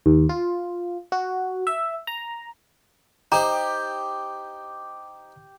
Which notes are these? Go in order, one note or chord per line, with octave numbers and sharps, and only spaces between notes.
D#2
F4
F#4
E5
A#5
D#4 G4 C5 A#5